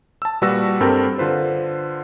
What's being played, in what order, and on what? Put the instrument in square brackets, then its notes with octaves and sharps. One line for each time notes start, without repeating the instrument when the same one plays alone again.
[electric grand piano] A5 E6
A#2 G3 F#4 B4 E6 A#6
G2 C4 G4 A4 A#4 G5
D3 F4 B4 C5